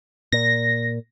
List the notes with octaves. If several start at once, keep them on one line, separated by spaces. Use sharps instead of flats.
A#2 A#6